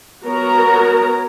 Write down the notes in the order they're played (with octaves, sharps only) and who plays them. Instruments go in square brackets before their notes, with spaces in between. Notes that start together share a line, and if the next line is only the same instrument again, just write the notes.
[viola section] B3 F#4 A#4 C#5 A#5